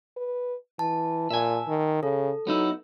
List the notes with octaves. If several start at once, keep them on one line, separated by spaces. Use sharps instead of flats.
B4
E3 A5
A#2 E5 G#5
D#3
C#3 A4
F#3 B3 D#4 E4